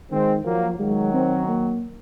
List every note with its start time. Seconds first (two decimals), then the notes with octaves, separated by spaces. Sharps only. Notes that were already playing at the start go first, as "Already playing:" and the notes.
0.11 D#3 G#3 C4
0.45 F3 F#3 A#3
0.79 D#3 F#3 G#3
1.13 C4
1.48 A#3